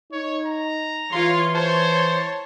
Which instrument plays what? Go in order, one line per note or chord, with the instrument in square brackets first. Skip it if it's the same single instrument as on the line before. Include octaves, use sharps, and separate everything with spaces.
[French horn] D#4 [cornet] C#5
[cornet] A#5
[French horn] E3 [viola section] F4 C#5 F5 [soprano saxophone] C6
[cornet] C5 [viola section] C#5 [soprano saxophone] A5